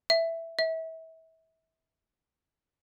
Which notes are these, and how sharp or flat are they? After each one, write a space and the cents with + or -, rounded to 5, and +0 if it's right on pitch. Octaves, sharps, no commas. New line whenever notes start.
E5 +5
E5 -30